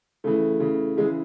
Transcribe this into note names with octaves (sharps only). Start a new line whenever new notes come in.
C#3 E3 A3
C#3 E3
C#3 E3 G#3